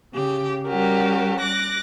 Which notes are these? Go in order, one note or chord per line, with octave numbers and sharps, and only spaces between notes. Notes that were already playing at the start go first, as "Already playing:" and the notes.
C#3 G4
G3 C#4 F#4 G4 A#4
D6 F#6 A#6